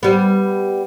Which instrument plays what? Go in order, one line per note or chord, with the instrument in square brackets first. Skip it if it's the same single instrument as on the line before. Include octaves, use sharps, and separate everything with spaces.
[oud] G3 B3